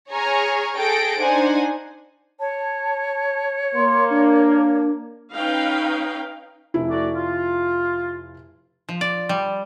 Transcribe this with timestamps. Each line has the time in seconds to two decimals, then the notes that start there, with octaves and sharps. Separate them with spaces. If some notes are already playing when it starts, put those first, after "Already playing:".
0.10 G#4 C#5 G#5 A#5 C#6 F6
0.76 G#4 A4 G5 A#6 D7
1.19 D4 D#4 C5 F#5 G#5
2.40 C#5 A5
3.75 A#3 C6
4.10 D4
5.34 C#4 D#4 B4 F5 G5
6.74 F1 E4
6.90 A3 F#4 D5
7.15 F4
8.89 F3
9.01 D5
9.29 G3